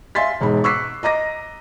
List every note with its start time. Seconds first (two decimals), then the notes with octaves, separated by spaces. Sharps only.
0.15 E5 F5 G#5 C6 A6 B6
0.41 E1 G#2 B5
0.64 C#6 D6 E6 F#6 B6 C7
1.03 D#5 A#5 D6 A#6